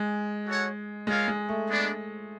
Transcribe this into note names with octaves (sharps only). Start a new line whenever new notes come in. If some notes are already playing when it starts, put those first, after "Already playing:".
Already playing: G#3
F#4 A4 C#5 F#5
G#3 F4 A#4 C#5 F5
G#3
A3
G#3 B3 D4